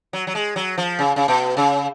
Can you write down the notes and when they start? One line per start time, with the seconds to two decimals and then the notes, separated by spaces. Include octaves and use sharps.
0.13 F#3
0.27 F#3
0.35 G#3
0.56 F#3
0.78 F3
0.99 C#3
1.16 C#3
1.28 B2
1.57 C#3